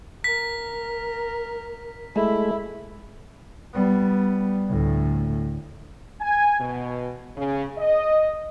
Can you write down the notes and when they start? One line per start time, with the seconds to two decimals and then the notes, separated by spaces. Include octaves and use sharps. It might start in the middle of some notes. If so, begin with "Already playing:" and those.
0.24 A#4 B6
2.16 G#3 A3 E4
3.74 G3 B3
4.70 D2 A2
6.21 G#5
6.60 B2
7.36 C#3
7.78 D#5